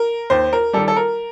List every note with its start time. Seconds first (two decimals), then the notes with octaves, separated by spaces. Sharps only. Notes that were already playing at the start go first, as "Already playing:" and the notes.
Already playing: A#4
0.30 D#2 C5
0.53 A#4
0.73 G3 A4
0.77 D#3
0.88 A4
0.96 A#4